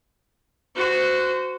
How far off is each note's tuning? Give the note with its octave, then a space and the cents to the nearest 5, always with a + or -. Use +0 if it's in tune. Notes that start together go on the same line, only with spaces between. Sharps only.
F#4 +0 C5 -25